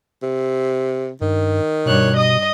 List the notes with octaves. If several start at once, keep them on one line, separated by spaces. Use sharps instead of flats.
C3
G2 D#3
G2 B2 C#5 F#6
D#5 D#6